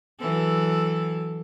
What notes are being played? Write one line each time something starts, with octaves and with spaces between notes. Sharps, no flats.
E3 F#3 A4